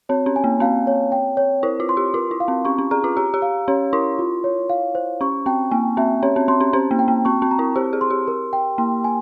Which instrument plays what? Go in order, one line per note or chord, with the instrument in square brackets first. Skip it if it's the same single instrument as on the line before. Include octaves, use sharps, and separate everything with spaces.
[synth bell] C4 [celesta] C#5
[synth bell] C#4
[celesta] G#5
[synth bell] A#3
[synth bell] C4 [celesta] F5
[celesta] C#5
G5
C#5
[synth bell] E4 [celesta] C5
[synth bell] F4
[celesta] C6
[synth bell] G4
[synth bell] F4 [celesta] A#4
[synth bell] E4
[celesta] F5
[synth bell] C4
[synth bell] C#4 [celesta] C#6
[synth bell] C#4
[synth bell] G#4 [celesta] A#5
[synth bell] F4
[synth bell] G4 [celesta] A#5
[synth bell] G4
[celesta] F5
[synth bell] C#4 [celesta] C#5
[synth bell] E4 [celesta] C6
[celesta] F4
C#5
F5
C5
[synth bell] C#4 [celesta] C#6
[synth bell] C4 [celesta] G5
[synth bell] A#3 [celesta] G#5
[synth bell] C4 [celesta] E5
[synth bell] C#4 [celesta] C#5
[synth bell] C4
[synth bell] C4 [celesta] C6
[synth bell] C#4
[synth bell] C#4 [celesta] C5
[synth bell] A#3
[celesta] G5
[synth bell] A#3
[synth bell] C4 [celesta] C#6
[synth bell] C4
[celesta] A#5
[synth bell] E4
[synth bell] G4 [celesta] C5
[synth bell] G#4
[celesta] C6
[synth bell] G4
[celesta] A#4
G5
[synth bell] A#3 [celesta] C6
[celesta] G#5